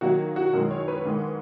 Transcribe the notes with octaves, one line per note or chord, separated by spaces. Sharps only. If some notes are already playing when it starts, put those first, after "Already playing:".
D#3 F#3 A#3 D#4 F#4
F#4
F#2 D#3 G#3 A#4
C#5
B4
G#2 D#3 G#3